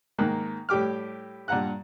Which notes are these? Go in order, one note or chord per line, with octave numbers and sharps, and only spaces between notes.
G#2 D#3 A#3 F#6
A2 G3 G4 D6 F6
G2 A#2 F#5 A#5 F#6